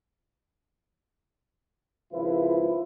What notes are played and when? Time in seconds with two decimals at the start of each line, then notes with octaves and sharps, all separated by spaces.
2.12 G#1 C#2 F3 E4 F4 B4